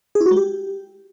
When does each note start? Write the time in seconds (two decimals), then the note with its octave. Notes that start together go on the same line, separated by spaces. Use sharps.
0.15 G#4
0.21 E4
0.26 F#4
0.31 G#3
0.36 G4